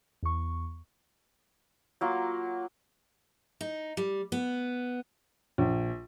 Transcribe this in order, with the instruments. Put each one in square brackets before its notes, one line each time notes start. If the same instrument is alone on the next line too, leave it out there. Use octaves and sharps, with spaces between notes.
[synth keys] E2 C#6
[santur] F#3 A#3 F4
[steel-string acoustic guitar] D#4
G3
B3
[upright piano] A#1